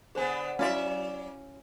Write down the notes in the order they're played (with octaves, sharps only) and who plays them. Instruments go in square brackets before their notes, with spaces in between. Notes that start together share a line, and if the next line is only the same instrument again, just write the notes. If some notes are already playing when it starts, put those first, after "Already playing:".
[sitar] D3 B3 [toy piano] G#4 C5 G#5
[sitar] F#3 D5 E5 [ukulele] C#4 [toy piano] E4 F#4 F5